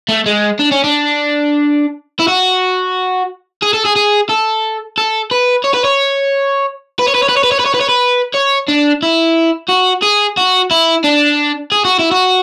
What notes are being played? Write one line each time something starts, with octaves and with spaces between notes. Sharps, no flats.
A3
G#3
D4
C#4
D4
E4
F#4
G#4
A4
G#4
G#4
A4
A4
B4
C#5
B4
C#5
B4
C#5
B4
C#5
B4
C#5
B4
C#5
B4
C#5
B4
C#5
B4
C#5
D4
E4
F#4
G#4
F#4
E4
D4
G#4
F#4
E4
F#4